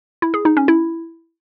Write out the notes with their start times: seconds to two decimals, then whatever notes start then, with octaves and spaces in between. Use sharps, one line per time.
0.22 E4
0.34 G#4
0.45 D#4
0.57 C#4
0.68 E4